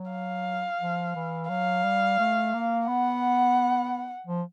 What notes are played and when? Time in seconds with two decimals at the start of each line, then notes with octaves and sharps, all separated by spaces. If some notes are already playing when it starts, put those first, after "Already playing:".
Already playing: F#3
0.11 F5
0.80 F3
1.15 E3
1.49 F#3 F5
1.84 G3
2.19 A3
2.53 A#3
2.88 B3 F#5
4.27 F3